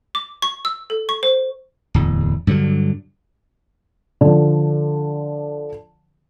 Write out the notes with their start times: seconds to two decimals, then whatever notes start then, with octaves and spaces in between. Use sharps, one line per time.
0.15 D6
0.42 C#6
0.65 E6
0.90 A4
1.09 C#6
1.23 C5
1.94 D1 E2
2.47 G2 D3 F3 F#3
4.21 D3 F3